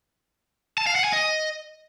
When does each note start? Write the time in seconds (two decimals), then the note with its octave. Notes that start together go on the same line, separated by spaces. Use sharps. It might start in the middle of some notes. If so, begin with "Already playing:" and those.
0.78 A5
0.87 F5
0.96 F#5
1.04 G#5
1.13 D#5